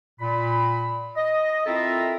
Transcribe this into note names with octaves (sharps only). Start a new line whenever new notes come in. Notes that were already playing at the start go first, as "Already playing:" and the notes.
A#2 B5
D#5
C4 E4 F4 A4 A#4 E5